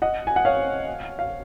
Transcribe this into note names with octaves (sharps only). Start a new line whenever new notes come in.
D#5 F#5
G#5
F#5
C#5 F5
F5